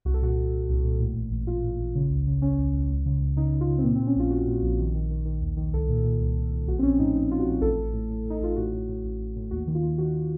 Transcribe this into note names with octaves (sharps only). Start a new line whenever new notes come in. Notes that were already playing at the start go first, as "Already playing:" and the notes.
C2 F#4
A4
A#2 F#4
C2
C2
C2
A#2
A2
A1
A1
A1 F4
A2
A1
C#3
C#2
C#3
C#3 C#4
C#2
C#2
C#2
C#3
C#2
C#3 D#4
C#3
F4
C#3
C4
A#2 A#3
C4
A#2
C#4
A#1 F4
A#1 F#4
A#2
A#1
D#3
D#3
D#3
D#3
D#2
D#3
C2 A4
A#2
A#2
C2
C2
C2
A#1 F#4
C4
A#1 C#4
A2 D#4
A#1 D#4
A#1 F4
F#4
A#1
A1 A4
A1
A2
A2
A2
D#4
A1 F4
A2 F#4
A2
A2
A1
A1
A2
D#2 F#4
D#3
F4
D#2
D#3 F#4